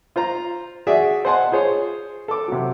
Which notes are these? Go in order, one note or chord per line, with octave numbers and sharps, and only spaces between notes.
F4 C5 A#5
F#4 G#4 D5 E5
C5 D#5 F#5 G#5 A5 C6
F4 G#4 C5 C#5
A4 D6
C3 F#3